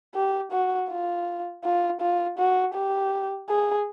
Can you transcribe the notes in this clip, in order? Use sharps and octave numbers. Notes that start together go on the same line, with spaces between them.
G4
F#4
F4
F4
F4
F#4
G4
G#4